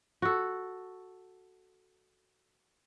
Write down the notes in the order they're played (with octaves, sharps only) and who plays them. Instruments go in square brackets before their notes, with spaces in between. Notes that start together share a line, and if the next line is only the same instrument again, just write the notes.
[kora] F#4 A4